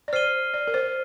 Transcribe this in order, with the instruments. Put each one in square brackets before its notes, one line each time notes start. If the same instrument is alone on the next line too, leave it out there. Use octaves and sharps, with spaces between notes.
[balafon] D5
[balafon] C5 [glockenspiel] F6 C7 D#7 G7
[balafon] D5
A#4
C5